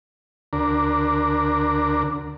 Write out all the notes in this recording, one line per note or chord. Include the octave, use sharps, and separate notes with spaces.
D2 D4 A#4